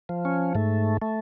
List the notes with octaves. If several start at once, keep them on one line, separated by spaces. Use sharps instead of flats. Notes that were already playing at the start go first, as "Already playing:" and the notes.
F3
C#4
G#2 A3
A3